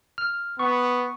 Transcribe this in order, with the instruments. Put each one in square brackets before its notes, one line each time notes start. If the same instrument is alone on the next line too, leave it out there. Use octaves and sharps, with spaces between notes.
[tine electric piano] F6
[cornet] B3 [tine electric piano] C#6